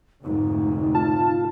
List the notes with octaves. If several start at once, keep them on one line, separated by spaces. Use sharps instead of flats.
F1 D2 G#2 D#4
F4 A5